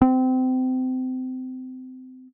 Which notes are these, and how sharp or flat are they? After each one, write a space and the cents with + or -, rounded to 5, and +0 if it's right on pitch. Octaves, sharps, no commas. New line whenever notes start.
C4 -30